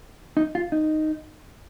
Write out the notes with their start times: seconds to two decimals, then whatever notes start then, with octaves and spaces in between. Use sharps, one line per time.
0.37 D#4
0.55 F4
0.72 D#4